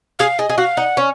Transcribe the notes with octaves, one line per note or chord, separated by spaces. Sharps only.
G#4 F5
G#4 D#5
G#4
F#4 F5
D#4 F#5
C#4